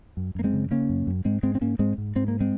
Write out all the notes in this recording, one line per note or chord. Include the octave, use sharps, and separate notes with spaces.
F#2
F#2 A#3
G#3 C4
C#3
C#3 A#3 C#4
F#2
F#2
G#2 G#3 C4
G#2 G#3 C4
C4
G#2 A#3 C#4
G#2 G#3 C4
G#2
G#2 C4
A#3
G#3 C4